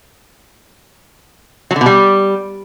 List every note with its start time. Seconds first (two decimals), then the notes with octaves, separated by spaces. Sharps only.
1.71 F#3
1.76 D3
1.81 B2
1.86 G3